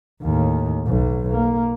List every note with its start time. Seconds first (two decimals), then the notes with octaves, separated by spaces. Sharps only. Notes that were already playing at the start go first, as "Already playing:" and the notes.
0.22 D#2 A2
0.86 B1
1.31 A#3